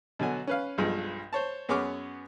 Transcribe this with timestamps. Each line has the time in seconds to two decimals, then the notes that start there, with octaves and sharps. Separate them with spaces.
0.19 B2 D3 F#3 G#5
0.47 C#4 B4 F5
0.78 B1 G2 F3 G#3
1.33 C5 C#5 A5
1.69 F#2 B3 G#4 C#5 D6 F6